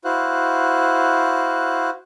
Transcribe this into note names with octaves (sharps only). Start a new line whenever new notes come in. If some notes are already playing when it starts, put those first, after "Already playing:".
E4 F#4 C5 F5 F#6